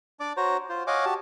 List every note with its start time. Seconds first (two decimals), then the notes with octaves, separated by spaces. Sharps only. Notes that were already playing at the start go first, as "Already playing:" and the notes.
0.20 D4 D5 D6
0.37 F#4 C5 C#5 A#5
0.69 F4 C5
0.87 C#5 D#5 F5 F#5 G#5 D6
1.05 F#4 G4 A5